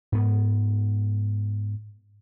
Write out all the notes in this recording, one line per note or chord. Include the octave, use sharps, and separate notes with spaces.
G#2 B3